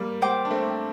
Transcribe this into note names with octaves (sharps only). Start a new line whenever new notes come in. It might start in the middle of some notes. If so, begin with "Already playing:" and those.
Already playing: G3 A#3
C5 G5 D6
D4
A3 C4